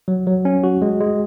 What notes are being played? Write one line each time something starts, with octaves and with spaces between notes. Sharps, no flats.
F#3
F#3
C#4
F#4
G#3
G#3